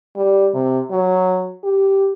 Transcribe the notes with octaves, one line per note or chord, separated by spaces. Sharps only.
G3
C3
F#3
G4